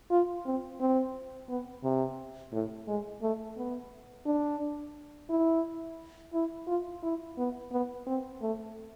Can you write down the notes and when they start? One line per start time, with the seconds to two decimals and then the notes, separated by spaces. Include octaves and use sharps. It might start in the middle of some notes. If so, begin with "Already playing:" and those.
0.11 F4
0.46 C4
0.80 C4
1.49 B3
1.84 C3
2.53 A2
2.88 G#3
3.22 A3
3.57 B3
4.26 D4
5.30 E4
6.34 E4
6.68 F4
7.03 E4
7.38 B3
7.72 B3
8.07 C4
8.42 A3